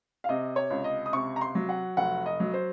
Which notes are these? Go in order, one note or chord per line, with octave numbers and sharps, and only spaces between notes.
F5
C3 D#5
C#5
C#2
D#5
D#6
C3 C#6
A#5
C6
F#3
F#5
F1 F#5
D#5
F#3
C5